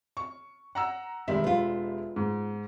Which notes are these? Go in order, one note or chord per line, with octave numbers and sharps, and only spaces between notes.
C#6
F#5 A#5 E6
E1 D#3 G3 E5
B3 F4
G#2